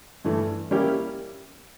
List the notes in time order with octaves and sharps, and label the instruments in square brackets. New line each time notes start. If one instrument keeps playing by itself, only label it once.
[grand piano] G2 E3 A3
G3 A#3 C#4 E4 G4